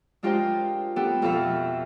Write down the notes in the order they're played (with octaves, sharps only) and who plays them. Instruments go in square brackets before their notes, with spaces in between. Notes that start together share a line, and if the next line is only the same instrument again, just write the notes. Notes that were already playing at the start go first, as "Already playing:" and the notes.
[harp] G#3 D4 F4 G4 A#4 C5
B3 C4 D4 G4 A4
F2 B2 F4 A4 E5 F5